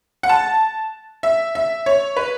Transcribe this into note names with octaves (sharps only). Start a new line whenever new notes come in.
F#5
A5
E5
E5
C#5
B4